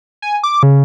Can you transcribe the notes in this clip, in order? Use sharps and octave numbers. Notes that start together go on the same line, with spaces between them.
G#5
D6
C#3